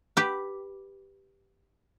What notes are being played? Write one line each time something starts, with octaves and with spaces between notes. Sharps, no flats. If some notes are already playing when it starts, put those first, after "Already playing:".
G4 B4